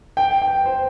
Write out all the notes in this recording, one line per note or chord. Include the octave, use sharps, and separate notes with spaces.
G5
G5
C5